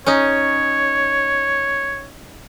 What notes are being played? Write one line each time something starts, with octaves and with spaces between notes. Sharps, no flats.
C#4 D#4 C#5